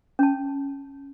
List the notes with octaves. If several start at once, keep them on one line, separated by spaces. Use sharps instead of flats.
C#4 A5